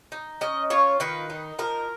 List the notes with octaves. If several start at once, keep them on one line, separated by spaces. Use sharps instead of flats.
D#4
C#4 D#5
F4 C#5
D#3 B4
D#4
F3 A#4